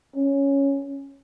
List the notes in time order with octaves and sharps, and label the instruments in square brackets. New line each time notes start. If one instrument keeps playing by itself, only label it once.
[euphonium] C#4